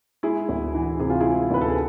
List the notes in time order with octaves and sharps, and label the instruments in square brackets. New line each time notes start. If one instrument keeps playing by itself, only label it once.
[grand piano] G#3 E4 G#4
D2
E3
C3 G#4
F4
G#3 E4 G#4
D2 B4
A4
G#4